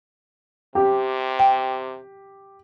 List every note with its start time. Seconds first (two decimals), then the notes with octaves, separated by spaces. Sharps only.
0.75 C3 G4
1.39 G5